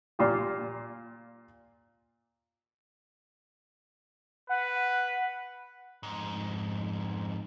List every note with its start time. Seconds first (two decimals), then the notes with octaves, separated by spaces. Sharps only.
0.19 A#2 F4 G4
4.49 B4 F#5
6.03 F2 G#2